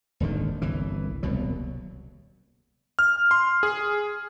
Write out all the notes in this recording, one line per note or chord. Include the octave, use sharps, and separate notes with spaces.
D#1 G#1 D3 D#3
G1 C2 E3
D#1 C2 B2 F#3
F6
C6
G#4